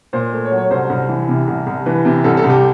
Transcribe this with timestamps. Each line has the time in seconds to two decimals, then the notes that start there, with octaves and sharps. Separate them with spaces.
0.13 A#2 C5
0.32 A3
0.45 C#5
0.51 F#3
0.58 C#5
0.70 C2 C5
0.89 C2
1.09 E3
1.28 C3
1.47 C2
1.66 C2
1.86 E3 B4
2.05 C3
2.24 C2 A4
2.37 A4
2.44 C2
2.50 G4